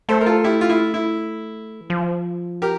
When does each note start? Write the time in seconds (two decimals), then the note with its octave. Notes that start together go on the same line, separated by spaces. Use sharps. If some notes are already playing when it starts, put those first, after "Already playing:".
0.09 A3 A4 C5
0.21 A#4
0.26 F4 A4
0.44 E4 G4
0.61 F4
0.69 E4
0.94 E4
1.81 E3
1.90 F3
2.62 G4 A#4